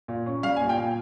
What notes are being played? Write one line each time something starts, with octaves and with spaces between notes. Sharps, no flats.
A#2
C#4
G3 F5
G#5
A#2
G5
A#2